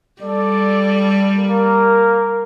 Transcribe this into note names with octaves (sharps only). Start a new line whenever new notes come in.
G3 A4 D5
A#3 A#4